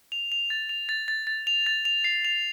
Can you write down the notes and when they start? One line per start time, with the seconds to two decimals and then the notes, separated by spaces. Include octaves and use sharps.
0.12 F7
0.32 F7
0.50 A6
0.69 F7
0.89 A6
1.08 A6
1.27 A6
1.47 F7
1.66 A6
1.85 F7
2.04 C7
2.25 F7